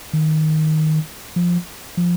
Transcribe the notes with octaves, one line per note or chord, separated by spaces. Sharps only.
D#3
F3
F3